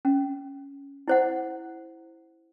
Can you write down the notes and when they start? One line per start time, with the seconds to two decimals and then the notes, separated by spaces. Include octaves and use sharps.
0.05 C#4
1.08 E4 C5 F#5